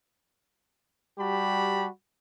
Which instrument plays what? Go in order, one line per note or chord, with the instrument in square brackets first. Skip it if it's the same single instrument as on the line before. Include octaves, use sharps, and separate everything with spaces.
[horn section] G3 F#4 G4 A5 B5